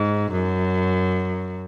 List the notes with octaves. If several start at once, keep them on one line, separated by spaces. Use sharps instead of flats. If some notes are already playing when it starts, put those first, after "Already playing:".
Already playing: G#2
F#2